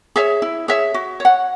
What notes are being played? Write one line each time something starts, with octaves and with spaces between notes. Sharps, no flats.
G#4 C#5 E5
E4
G#4 C#5 E5
F#4
C#5 F#5